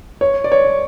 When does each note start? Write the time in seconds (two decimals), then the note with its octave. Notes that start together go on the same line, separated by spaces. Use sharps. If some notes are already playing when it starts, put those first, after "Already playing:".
0.21 C#5
0.44 D5
0.52 C#5